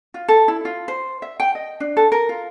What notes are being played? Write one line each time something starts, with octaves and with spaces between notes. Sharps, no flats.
F4
A4
E4
F4
C5
E5
G5
D#5
D4
A4
A#4
F4